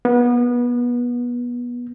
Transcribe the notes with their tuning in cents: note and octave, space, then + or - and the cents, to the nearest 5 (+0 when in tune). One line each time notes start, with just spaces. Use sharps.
B3 -25